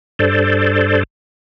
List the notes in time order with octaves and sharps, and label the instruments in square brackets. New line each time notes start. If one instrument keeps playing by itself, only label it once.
[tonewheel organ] G2 A4 C5 D5